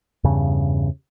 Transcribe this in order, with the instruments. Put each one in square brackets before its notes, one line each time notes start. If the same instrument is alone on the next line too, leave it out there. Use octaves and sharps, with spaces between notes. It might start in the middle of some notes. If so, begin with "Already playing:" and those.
[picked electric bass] E2 G2 C#3